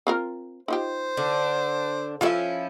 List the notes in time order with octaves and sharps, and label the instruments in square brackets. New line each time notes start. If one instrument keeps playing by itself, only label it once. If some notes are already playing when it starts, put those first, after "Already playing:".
[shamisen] C4 F4 A#4
[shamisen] D#4 F4 G4 [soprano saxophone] C5
[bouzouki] D3 D4
[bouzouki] F3 C#4 E4 [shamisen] F4 A4 E5